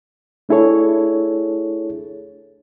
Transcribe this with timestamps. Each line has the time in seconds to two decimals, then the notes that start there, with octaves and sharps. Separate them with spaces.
0.49 A3 D4 E4 G#4 A4 C#5